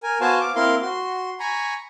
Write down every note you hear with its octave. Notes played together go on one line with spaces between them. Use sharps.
A#4 G#5
B3 F#4 C5 F5 G#5 A5
F5 D6
A#3 C4 E4 A#4 F5 C6
F#4 C6
G#5 A#5 B5 C#6